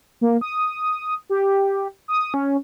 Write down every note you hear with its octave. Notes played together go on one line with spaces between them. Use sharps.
A#3
D#6
G4
D#6
C#4